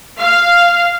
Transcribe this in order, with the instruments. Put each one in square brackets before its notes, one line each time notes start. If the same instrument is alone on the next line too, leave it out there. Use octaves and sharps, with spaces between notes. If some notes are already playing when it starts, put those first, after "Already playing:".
[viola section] F5